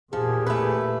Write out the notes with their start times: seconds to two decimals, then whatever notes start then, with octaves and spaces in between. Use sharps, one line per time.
0.13 E2 A#2 F3 G4 G#4
0.47 A3 B4